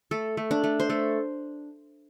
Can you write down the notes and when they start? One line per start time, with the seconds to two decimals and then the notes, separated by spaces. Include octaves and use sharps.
0.11 A3 A4
0.37 A3
0.51 D4
0.64 A3
0.80 C5
0.89 A3 A4